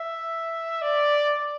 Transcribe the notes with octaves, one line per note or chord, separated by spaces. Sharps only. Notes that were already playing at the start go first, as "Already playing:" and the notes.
Already playing: E5
D5